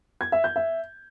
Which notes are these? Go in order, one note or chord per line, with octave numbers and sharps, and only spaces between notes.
G#6
E5
G6
E5